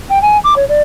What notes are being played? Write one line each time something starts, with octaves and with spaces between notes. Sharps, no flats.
G5
G#5
D6
C#5
D5